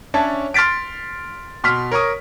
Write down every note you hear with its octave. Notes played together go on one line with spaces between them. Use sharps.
C#4 D4 C#5 E5 A5
C6 F6 A6 B6 D7
B2 C6 F6 B6
A#4 C#5 A#5 C#6 D#6